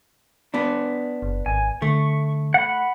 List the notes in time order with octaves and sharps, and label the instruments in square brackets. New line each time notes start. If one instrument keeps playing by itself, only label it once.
[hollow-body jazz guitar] B3 D4
[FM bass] F#1
[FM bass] G#1 [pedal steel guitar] G#5
[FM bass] D3 [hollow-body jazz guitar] A3 [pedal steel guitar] C#6
[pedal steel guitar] F#5 B5